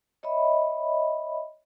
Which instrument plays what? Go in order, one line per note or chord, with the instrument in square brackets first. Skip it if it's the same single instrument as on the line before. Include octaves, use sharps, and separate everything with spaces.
[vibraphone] C#5 D#5 E5 B5